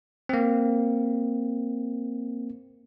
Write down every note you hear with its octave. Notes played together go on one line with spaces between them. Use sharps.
A#3 C4